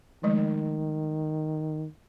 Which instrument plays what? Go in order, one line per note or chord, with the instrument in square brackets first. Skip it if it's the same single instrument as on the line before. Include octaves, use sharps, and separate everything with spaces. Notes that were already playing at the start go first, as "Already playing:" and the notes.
[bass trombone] D#3 [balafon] F3 G#3 A3